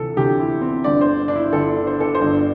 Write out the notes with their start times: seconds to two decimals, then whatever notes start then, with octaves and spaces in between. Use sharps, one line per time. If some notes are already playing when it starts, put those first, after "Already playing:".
Already playing: D2 C3 E3 A4
0.17 D2 C3 E3 G4
0.40 E4
0.61 C4
0.84 G1 G2 D3 D5
1.01 C5
1.28 D4
1.36 E4
1.53 G1 G2 D3 A4
1.87 C5
2.00 A4
2.15 C5
2.20 G1 G2 D3